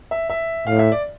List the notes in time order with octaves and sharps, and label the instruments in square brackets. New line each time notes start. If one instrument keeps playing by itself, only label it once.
[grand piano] E5
E5
[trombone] A2 [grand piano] F5
[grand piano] E5
D5